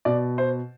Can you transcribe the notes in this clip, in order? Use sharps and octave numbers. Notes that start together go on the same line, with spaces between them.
B2 D5
C5